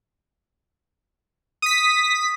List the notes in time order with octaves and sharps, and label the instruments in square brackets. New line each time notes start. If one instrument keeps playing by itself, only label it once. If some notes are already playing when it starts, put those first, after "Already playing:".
[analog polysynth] D#6 B6